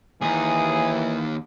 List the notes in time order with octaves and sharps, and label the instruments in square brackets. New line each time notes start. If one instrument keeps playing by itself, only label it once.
[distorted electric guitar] D#2 D#4 [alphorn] E3 [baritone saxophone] G#4